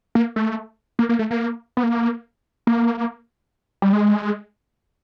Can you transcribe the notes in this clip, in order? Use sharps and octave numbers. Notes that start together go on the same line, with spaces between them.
A#3
A3
A#3
A#3
A3
A#3
B3
A#3
A#3
G3
G#3